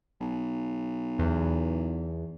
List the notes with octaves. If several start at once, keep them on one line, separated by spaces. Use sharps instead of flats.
B1
E2